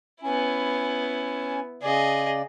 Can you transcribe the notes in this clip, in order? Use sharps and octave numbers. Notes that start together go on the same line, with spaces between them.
B3 C#4 E4 G#5
C#3 G#4 D5 D#5